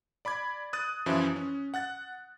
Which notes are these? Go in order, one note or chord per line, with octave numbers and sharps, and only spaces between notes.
D5 B5 D6 G#6
D#6 F#6 A6 D#7
F#2 E3 F3 C#4 E4
C#4
F#5 F#6 A6